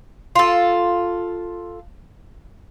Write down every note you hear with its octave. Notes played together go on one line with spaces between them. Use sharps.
F4 A4